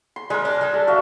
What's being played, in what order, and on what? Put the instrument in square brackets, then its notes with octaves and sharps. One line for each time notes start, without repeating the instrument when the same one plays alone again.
[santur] C6
[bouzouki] G3 [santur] G#3 A#4
[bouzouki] D4
G3 D4
[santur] A4
F#4 E5 F5